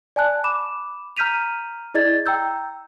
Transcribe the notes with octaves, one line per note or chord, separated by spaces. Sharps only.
D5 G#5 A5 F#6
B5 D6 E7
A#5 F6 G6 B6 D#7 F7
E4 G#4 D5 D#5 G#6 A6
G5 A#5 E6 G6